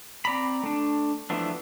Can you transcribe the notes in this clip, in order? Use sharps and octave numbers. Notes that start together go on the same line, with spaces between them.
C4 D5 A#5 B5
A3 D4
E3 F3 A3 B3 D4